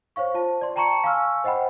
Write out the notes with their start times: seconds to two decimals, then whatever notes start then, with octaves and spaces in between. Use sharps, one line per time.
0.16 C5 C#5 F5 C#6
0.34 F4 C5 A5
0.61 D5 C6
0.76 G5 A5 A#5 C6 C#6 C#7
1.04 F5 G#5 C6 C#6 E6 F6
1.44 C5 D#5 F#5 G5 B5